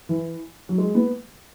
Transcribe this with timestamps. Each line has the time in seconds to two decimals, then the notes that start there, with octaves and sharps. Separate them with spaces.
0.09 E3
0.69 F#3
0.78 G#3
0.95 B3